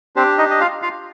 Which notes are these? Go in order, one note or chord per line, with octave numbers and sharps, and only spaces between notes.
C4 D4 G4 C5
D#4 D#5
D#5
F4 F5
F4 F5